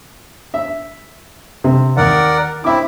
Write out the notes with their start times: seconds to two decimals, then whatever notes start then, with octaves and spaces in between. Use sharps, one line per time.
0.54 E5
1.64 C3
1.97 D#2 A#4 D5 F#5
2.64 C4 E4 E5 D6